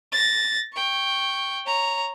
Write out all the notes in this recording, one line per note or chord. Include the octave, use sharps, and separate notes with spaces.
A6 A#6
G5 C#6
C#5 A#5